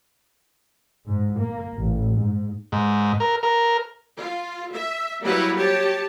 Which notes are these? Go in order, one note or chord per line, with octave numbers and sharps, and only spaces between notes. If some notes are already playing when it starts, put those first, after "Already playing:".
G#2
A#3
A1
G#2
G#2
A#4
A#4
F4
E5
F#3 G3 A#3 E4 B4 C#5
G4 C#5 A5